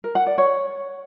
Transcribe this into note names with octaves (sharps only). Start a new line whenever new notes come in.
A#4
F#5
D5
C#5